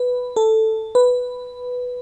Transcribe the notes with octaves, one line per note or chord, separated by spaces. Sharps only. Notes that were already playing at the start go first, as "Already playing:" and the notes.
Already playing: B4
A4
B4